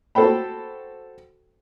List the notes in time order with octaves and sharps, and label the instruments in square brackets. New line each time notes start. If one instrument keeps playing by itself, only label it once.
[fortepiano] F#4 A4 C5 G5 B5